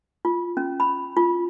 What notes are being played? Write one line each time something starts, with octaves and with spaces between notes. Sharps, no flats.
F4
C#4
B5
F4